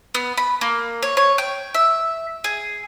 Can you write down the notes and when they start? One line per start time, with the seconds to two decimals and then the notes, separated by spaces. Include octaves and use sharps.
0.15 B3
0.37 B5
0.61 A#3
1.03 C#5
1.17 C#5
1.38 G5
1.74 E5
2.44 G#4